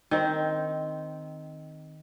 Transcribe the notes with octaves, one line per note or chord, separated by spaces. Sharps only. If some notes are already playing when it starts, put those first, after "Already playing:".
D#3 C4